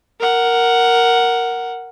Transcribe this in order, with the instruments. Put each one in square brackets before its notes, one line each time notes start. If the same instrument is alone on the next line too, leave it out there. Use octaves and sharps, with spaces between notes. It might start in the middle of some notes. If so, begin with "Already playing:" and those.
[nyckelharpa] A#4 F#5